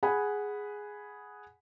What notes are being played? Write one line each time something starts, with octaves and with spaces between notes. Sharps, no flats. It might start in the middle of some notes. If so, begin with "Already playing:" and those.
G#4 F#5 G#5 B5